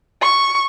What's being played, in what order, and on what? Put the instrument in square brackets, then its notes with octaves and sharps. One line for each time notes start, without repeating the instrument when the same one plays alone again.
[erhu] C#6